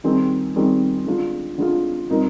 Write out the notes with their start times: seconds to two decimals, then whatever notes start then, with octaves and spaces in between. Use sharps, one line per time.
0.04 D#3 G3 C4 D#4 G#4
0.55 D#3 G3 C4 D#4 G#4
1.07 D3 G#3 D4 F4
1.58 D3 G#3 D4 F4
2.10 A#2 G3 C4 D#4 A#4